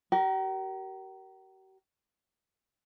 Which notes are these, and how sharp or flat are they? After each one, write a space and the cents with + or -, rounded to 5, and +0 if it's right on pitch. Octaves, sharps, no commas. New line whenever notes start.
G4 -45 A#4 +0